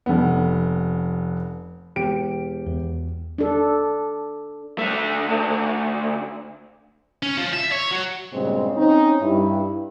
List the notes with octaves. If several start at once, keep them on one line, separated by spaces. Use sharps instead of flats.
F1 B3
E1 G4 D7
E2
D4 A4
D2 A3
C#4
F3
E5
C#5
F#3
G2 A#2 C#3 F#3 G#3 C4
C4 C#4 D#4
G2 E4